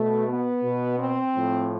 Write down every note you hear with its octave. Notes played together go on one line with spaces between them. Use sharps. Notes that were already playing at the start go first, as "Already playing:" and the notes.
Already playing: B2 A3
B3
B2
C4
A2 F3